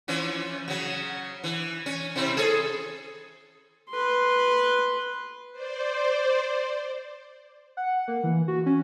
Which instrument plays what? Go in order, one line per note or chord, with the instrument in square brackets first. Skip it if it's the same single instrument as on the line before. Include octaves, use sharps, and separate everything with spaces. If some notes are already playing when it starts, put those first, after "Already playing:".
[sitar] E3 F3 C#4
C#3 F#3
E3
C#4
C3 C4 E4
G#4 A4 C#5
[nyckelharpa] B4 C6
[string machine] C5 D5
[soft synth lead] F#5
A#3
E3
F#4
C#4